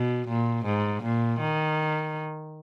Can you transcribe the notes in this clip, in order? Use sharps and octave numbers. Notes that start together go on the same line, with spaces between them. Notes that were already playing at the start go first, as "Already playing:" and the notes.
Already playing: B2
A#2
G#2
A#2
D#3